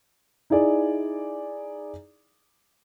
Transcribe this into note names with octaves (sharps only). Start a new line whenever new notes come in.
D#4 E4 G#4 D5 G#5